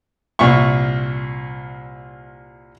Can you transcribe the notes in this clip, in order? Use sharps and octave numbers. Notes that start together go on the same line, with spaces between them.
C2 A#2 E5 C#6